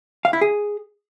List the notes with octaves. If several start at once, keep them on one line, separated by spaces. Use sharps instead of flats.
F5
E4
G#4